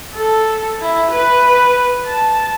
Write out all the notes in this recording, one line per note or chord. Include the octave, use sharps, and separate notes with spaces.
A4
E4
B4
A5